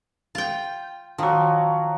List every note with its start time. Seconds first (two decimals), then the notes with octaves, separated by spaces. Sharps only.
0.35 F4 G5
1.18 D#3 F3 F#3